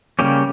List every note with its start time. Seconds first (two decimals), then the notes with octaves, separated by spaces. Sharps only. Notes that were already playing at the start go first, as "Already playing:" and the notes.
0.19 C#3 G3 A#3 C#4 G4